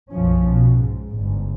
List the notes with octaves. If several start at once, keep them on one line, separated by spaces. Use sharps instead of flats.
B1 F#2 F3 C#4
B2
G#2
G1 G#2